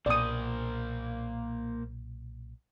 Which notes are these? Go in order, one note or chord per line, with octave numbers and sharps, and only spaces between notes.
B1 A#2 A#3 C5 D5 D#6